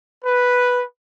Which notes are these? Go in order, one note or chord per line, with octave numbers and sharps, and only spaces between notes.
B4